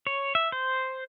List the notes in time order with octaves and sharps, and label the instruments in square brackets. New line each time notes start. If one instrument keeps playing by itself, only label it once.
[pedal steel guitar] C#5
E5
C5